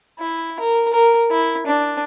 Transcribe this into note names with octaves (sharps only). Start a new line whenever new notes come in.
E4
A#4
A#4
E4
D4